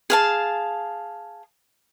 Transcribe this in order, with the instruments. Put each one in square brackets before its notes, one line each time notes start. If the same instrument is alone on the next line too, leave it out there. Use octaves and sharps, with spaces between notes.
[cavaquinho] G#4 F5 A5